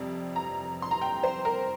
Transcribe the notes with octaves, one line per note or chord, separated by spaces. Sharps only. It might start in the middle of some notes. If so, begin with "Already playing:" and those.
Already playing: F2 C3 G3 C4
A#5
C6
A#5
G5
C5
A#4